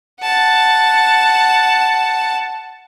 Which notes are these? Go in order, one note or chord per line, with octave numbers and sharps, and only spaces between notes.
F#5 A5